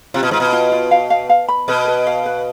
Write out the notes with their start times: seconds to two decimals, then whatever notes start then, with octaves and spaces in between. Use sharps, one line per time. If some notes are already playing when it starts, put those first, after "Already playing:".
0.14 C3 F4
0.23 B2
0.31 G#2 F4
0.40 B2
0.53 F4
0.72 F4
0.91 F5
1.10 F5
1.30 F5
1.48 B5
1.68 B2 B4
1.87 B4
2.07 F5
2.26 B4